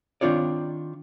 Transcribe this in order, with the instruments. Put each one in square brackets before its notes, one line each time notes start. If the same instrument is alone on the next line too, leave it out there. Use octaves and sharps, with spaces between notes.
[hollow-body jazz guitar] D#3 C4 D4 F4 C#5 D5